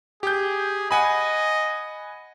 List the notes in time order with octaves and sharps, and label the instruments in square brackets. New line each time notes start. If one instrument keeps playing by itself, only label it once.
[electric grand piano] G4 G6 [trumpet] G#4
[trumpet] D#5 [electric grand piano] F#5 G#5 B5